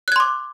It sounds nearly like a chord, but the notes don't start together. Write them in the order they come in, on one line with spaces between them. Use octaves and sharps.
F#6 G#6 C6 D6